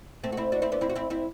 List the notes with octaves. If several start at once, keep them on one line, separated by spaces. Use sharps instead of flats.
A3 C4
F#4
C4 E4
D4 F#4
C4 E4
B3 D4
C4 E4
F#4
C4 E4
C4 E4